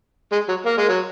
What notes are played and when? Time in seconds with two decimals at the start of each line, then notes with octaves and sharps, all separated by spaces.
0.32 G#3
0.48 F#3
0.66 A#3
0.78 G#3
0.89 F#3